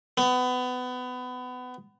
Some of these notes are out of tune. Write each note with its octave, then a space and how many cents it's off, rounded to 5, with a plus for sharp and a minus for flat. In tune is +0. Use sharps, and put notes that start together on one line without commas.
B3 +25